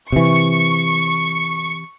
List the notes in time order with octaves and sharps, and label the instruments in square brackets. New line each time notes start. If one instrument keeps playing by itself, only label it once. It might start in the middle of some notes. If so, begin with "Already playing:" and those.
[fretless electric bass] C3 E3 [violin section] C#6